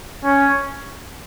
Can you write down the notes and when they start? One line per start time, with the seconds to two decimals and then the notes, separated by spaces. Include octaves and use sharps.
0.24 C#4